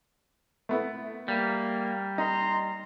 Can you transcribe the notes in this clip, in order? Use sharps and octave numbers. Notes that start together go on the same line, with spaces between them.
A3 B3 E4
G3 A#3
D#4 A#5 C6